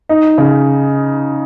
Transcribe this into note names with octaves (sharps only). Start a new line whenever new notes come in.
D#4
C#3